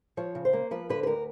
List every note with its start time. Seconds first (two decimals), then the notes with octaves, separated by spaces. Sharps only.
0.17 F3 C#5
0.35 C#3
0.45 C5
0.53 A#3
0.71 F3 B4
0.90 D3 B4
1.03 B4
1.07 D2 A#4